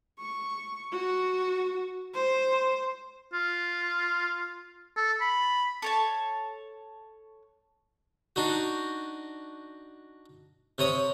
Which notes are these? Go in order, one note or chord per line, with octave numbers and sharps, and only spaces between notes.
C#6
F#4
C5
F4
A4
B5
A4 C#5 A5
D4 D#4 F#4
C3 C#5 D#6